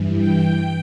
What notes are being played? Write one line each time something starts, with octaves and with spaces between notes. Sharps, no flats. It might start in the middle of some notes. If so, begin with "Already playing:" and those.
Already playing: G2 E3
G5